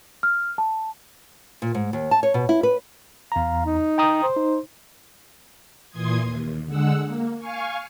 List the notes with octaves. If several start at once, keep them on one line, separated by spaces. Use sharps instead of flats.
F6
A5
A#2
G#2
D#2
A5
C#5
B2
E4
B4
E2 F5 A#5
D#4
G5 A#5 D#6
C5
D#4
A#2 E3 C6 D#6 G#6
D#2
D3 G#3 F#5 E6
A#3
F5 G#5 C#6